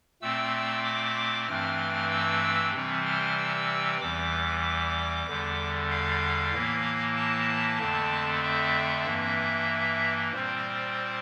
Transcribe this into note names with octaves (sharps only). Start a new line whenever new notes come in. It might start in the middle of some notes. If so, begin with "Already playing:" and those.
A#2 A3 C4 E6
D6
G2 E3 A3 C4 F6
E6
C3 E3 G3 C4
F6
E6
E2 E3 G3 D6
E2 D3 G3
F5
A2 E3 A#3
A5
F2 D3 A3 C4
E5
G2 E3 A#3
A#2 G3 C4 C5